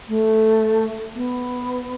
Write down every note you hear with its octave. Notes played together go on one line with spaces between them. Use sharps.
A3
B3